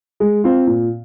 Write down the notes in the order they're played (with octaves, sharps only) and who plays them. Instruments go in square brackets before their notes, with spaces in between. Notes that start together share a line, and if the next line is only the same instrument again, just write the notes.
[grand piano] G#3
C4 F4
A#2